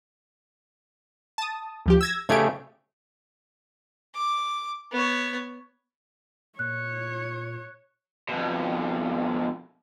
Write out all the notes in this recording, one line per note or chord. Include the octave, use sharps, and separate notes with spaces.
A5 D#6
D2 F3 G4
E6 G#6 A#6
C#3 A3 G4 G#6 D7
D6
B3 C#5
A#2 C#5 F#6
F2 B2